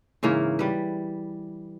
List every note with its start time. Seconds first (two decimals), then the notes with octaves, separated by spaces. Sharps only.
0.23 G#2 C#3 E3 A#3
0.59 G3 B4